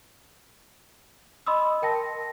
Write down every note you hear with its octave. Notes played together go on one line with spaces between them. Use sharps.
D#5 B5 C6 D#6 E6
A#4 G5 A5 A#6